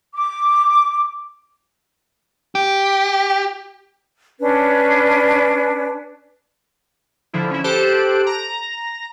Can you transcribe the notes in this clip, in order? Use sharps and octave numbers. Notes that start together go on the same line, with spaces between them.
D6
G4
C#4 D4 B4
D3 F3 E4
C#4 E4
G4 A4 C5 A5 F#6 D7
A#5 A#6